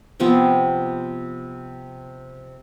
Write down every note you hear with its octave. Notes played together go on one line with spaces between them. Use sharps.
C3 F3 B3 C4